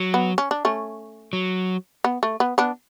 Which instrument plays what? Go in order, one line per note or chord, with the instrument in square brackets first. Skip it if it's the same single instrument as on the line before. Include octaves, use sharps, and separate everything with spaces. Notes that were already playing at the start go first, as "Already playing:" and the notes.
Already playing: [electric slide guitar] F#3
[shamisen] B3
C#4
D4
A3 C#4
[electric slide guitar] F#3
[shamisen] B3
A3
B3
B3 D4